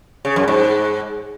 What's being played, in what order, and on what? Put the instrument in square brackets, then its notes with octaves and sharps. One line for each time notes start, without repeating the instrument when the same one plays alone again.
[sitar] C#3
F#2
G#2